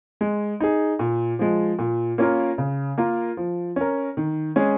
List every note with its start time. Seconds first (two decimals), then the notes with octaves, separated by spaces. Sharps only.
0.21 G#3
0.60 D#4 G#4
0.99 A#2
1.39 F3 G#3
1.79 A#2
2.18 A#3 C#4 F4 A#4
2.58 C#3
2.98 A#3 F4 A#4
3.37 F3
3.76 C#4 A#4
4.17 D#3
4.56 G#3 C#4 G#4